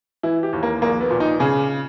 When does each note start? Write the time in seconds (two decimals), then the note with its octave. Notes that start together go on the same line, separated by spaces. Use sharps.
0.23 E3 E4
0.43 G4
0.53 D#2
0.63 A#3
0.81 A#1 A#3
1.00 B3
1.11 A#2
1.20 D#4
1.40 C#3 G#4